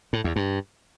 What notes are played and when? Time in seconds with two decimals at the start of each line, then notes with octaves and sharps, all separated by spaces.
0.13 A2
0.24 E2
0.36 G2